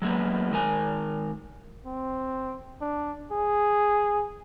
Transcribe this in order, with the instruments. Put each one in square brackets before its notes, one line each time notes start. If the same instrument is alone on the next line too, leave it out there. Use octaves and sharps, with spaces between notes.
[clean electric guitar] F#3 G#3 A#3 B3
D#3 G#3 A#4 G#5
[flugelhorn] C4
D4
G#4